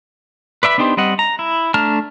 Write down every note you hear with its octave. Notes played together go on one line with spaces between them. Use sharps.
B4 D5 E5 B5
B3 D4 D#4 G4 C5
G3 C4 D#5 F#5
A#5
E4
A3 D4 A5 A#5 F6